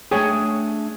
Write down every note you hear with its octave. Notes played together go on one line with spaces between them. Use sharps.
A3 D4 G#4 C#5 G5 G#5